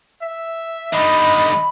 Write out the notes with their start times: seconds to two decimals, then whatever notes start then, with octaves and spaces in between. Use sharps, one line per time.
0.23 E5
0.93 D3 G3 D#4 D#5 B5